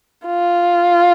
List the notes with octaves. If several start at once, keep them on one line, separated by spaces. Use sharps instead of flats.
F4